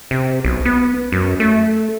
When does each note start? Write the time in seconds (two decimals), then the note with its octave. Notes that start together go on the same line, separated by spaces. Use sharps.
0.11 C3
0.45 B1
0.65 B3
1.12 F#2
1.40 A3